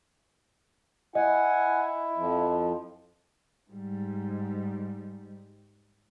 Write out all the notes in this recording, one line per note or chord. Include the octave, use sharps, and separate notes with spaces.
E4 D#5 F#5 G#5
F2 F3
G#2 G3